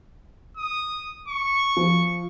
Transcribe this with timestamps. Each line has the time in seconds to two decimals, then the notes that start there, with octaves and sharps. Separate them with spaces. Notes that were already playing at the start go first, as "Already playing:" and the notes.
0.57 D#6
1.28 C#6
1.77 F3